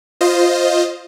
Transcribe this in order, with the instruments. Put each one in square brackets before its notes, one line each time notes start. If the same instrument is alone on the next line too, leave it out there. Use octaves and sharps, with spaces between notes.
[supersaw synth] F4 C5 D#5